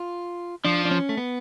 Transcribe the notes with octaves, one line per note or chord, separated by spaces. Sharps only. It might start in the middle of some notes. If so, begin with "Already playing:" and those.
Already playing: F4
F3 D4
D4
C#4
A3
B3